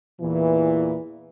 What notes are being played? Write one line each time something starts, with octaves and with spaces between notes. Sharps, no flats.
E2 A#2 E3